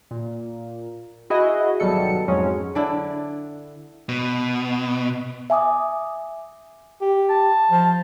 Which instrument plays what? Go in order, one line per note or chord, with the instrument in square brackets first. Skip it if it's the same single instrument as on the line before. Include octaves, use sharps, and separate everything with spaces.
[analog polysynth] A#2
E4 F#4 G#4 D#5
G#1 B2 F#3 G3 A4 C#7
F2 G#2 F#3 G#3 C#4
[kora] D3 D4 E4
[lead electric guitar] B2
[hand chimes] E5 G#5 D6 D#6
[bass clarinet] G4
[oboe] A5
[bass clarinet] F3